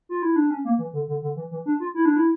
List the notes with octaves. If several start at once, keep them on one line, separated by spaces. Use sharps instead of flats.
F4
E4
D4
C#4
A#3
E3
D3
D3
D3
E3
E3
D4
F4
E4
D4
E4